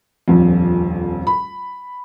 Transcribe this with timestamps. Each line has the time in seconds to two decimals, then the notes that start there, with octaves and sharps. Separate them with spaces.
0.28 D#1 A#1 F2
1.27 B5